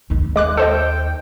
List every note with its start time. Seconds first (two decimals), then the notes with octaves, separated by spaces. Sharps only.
0.10 D#2 D#4
0.36 G#3 D6 F#6
0.57 A4 C5 D#5 G5